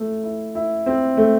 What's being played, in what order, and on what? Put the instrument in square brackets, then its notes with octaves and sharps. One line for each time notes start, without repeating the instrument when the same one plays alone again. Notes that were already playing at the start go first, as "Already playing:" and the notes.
Already playing: [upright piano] A3 E4
E4
E4
C4
A3